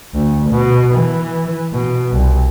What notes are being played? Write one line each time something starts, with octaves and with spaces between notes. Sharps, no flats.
D2
B2
E3
B2
C2